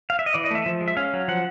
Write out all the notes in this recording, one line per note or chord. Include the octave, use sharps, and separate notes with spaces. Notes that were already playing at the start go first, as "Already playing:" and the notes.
F5
E5
D#5
E3 D5
D#5
A3 E5
F3
G#3
E5
C#4 F5
F#3
F3 F#5